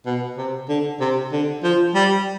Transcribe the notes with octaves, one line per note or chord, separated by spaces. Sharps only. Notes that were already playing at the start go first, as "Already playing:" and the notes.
B2
C3
D3
C3
D3
F3
G3